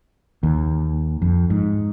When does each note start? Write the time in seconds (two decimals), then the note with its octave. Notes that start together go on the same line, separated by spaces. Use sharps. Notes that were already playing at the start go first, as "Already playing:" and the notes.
0.43 D#2
1.22 F2
1.50 G#2